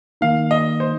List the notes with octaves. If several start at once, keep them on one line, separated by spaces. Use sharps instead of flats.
D#3 A#3 D#4 F5
D#5
C5